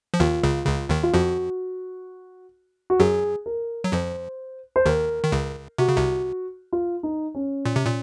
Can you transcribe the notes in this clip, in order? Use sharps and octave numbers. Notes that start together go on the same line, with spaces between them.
F3
D#2 D#3 F4
C#2 C#3
C#2 C#3
D#2 D#3
F4
F2 F3 F#4
F#4
F#2 F#3 G#4
A#4
F#3
F2 F3 C5
C5
D#2 D#3 A#4
D#3
C#2 C#3
C3 F#4
C#3
C2 C3
F4
D#4
C#4
A#2
C3
A#2